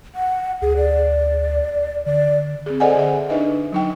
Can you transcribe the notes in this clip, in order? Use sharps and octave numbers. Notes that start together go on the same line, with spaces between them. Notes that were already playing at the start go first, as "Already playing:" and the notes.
F#5
D2 G#4
D5
D3 D5
C4 G#4
A4 C5 D5 D#5 F#5 G#5
D3 G#4 E5
D4 D#4 B4 D#5 E5
F#3 D#4 G5